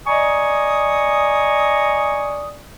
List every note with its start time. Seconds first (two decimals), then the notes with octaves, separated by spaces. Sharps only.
0.06 D5 D#5 G#5 A#5 C#6 D#6